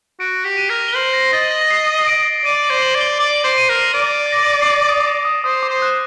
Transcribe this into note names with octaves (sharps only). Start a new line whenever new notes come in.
F#4 D7
G4
D#7
A#4
G7
C5 F#7
A#6
D#5 A6
A#6
A#6
C7
C7
D7
D7
D5 D#7
F#7
C5
F#7
D5
G7
D5
D7
C5
D#7
A#4
C7
D5 D7
A6
A#6
D7
C7
A#6
D#6
D6
D#6
C5 D#6
D6
C5
F#6